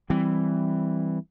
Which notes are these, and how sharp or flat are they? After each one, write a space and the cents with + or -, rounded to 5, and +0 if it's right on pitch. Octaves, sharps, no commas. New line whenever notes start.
E3 +0 G3 +0 C4 +0